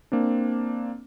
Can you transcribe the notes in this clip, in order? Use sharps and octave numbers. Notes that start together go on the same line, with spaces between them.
A#3 C4 D4